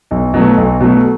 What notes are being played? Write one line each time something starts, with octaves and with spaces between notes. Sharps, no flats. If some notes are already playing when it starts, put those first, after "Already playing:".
B1
B2 F#3 A3
B1
B2 F#3 A3